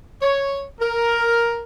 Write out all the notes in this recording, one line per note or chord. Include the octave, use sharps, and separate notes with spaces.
C#5
A#4